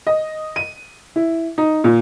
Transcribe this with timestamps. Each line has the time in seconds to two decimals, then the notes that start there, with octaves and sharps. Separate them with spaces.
0.07 D#5
0.56 D#7
1.16 E4
1.58 D#4
1.84 A#2